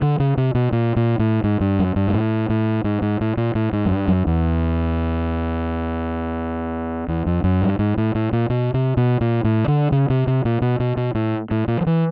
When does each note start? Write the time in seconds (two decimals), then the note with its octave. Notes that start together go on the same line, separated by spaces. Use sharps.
0.02 D3
0.20 C#3
0.37 C3
0.55 B2
0.72 A#2
0.96 A#2
1.19 A2
1.44 G#2
1.61 G2
1.79 F#2
1.96 G2
2.08 G#2
2.14 A2
2.50 A2
2.84 G#2
3.02 G#2
3.21 A2
3.37 A#2
3.55 A2
3.73 G#2
3.86 F#2
3.91 G2
4.08 F#2
4.27 E2
7.08 E2
7.27 F2
7.44 F#2
7.62 G2
7.79 G#2
7.98 A2
8.15 A2
8.33 A#2
8.50 B2
8.74 C3
8.97 B2
9.21 A#2
9.44 A2
9.68 D3
9.92 C#3
10.10 C3
10.27 C3
10.45 A#2
10.62 B2
10.80 B2
10.97 B2
11.15 A2
11.51 A2
11.68 A#2
11.81 F3
11.86 E3